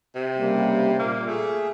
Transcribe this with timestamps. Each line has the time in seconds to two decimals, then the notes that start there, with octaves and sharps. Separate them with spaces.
0.15 C3
0.38 C#3 G3 A#3
0.99 A#2 A#3
1.27 A3 G#4 E5